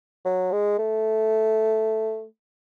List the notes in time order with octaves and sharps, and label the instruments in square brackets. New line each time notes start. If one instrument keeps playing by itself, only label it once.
[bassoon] F#3
G#3
A3